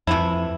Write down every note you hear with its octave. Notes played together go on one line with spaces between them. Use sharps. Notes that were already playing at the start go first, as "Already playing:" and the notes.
F2 C3 E3 A3 E4